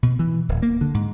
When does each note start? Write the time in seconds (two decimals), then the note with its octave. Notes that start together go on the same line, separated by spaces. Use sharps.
0.03 B2
0.19 E3
0.49 D1
0.62 A#3
0.81 D3
0.94 G#2